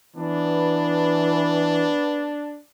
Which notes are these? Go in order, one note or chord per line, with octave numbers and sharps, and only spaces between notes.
E3 B3 D4